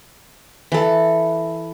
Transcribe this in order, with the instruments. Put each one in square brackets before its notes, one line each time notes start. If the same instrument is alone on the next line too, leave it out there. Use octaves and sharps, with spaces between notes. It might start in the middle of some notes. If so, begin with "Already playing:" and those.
[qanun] E3 A4